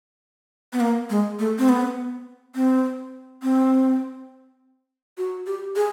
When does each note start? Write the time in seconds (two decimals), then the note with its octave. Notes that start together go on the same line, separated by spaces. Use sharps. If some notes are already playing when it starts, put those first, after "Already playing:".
0.73 B3
0.80 A#3
1.10 G#3
1.39 A3
1.58 C4
1.69 B3
2.55 C4
3.43 C4
5.18 F#4
5.46 G4
5.76 G#4